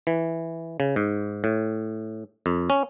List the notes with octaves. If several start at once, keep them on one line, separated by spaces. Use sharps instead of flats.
E3
C#3
G#2
A2
F2
C#4